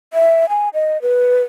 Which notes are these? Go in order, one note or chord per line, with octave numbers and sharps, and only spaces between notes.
E5
G#5
D#5
B4